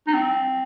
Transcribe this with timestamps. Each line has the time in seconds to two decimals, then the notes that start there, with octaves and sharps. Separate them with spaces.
0.07 D#4
0.14 C4